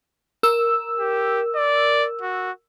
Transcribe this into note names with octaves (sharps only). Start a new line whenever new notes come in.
A#4 E6
G4
D5
F#4